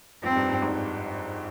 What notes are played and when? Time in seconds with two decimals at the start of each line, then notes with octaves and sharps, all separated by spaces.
0.23 F2 C4
0.30 G#2
0.36 G2
0.49 G2
0.62 G#1 G#2